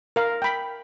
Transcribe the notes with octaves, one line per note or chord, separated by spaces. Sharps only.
A#4 F5
G5 B5